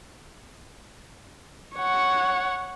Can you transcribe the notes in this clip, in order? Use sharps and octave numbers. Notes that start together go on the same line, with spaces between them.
C#5 F#5